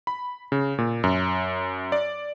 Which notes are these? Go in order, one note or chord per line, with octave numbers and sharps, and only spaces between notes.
B5
C#3
A#2
F#2
D5